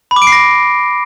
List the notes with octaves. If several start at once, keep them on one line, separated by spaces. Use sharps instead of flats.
B5
D6
D7
C7
A#6